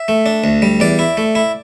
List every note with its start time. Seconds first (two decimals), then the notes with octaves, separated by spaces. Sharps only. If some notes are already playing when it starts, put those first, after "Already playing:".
Already playing: E5
0.08 A3
0.26 D4
0.44 D2
0.62 G3
0.80 E2 D5
0.99 E4
1.17 A3
1.35 E4